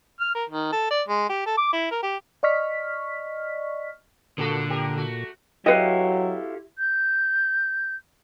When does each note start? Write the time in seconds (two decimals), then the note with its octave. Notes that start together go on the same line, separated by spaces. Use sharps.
0.20 F6
0.35 A#4
0.50 D#3
0.72 A4
0.90 D5
1.08 G#3
1.29 G4
1.46 A4
1.57 D6
1.73 E4
1.91 A#4
2.03 G4
2.43 D5 D#5 C#6 F6 B6
4.38 A#2 D3 A#3 F#4 A4
4.70 G4 A#4
4.96 A3 F#4
5.66 F#3 E4 F#4 G4 A4 B4 D#5 F5
6.78 G6